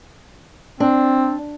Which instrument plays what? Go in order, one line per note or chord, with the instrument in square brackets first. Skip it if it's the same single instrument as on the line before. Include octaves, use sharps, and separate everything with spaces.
[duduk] C4 [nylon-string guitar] D4